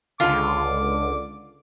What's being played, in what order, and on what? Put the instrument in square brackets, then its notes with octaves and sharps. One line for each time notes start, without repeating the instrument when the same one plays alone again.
[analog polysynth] C#2 D3 [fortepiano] F4 [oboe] D6